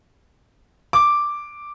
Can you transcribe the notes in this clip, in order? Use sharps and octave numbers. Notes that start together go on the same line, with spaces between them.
D6